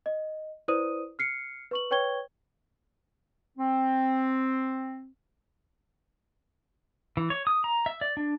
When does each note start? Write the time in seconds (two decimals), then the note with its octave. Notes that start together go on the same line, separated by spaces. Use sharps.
0.06 D#5
0.68 E4 B4 C5 D5 D#6 D#7
1.19 F6 C7 C#7
1.71 B4 C#6 F#7
1.91 B4 C#5 G5 C#6 G#6 G7
3.58 C4
7.17 E3
7.30 C#5
7.47 D#6
7.64 A#5
7.86 E5
8.01 D5
8.17 D4